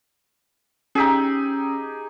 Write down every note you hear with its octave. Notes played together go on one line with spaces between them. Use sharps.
C#4 D#4 G4 G#4 E6